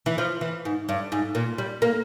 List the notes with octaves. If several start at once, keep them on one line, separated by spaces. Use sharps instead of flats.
E3
F3
E3
G#2
G2
G#2
A#2
G3
A#3